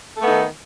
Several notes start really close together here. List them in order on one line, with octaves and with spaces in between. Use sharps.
A4 A3 B3 D#4 D#3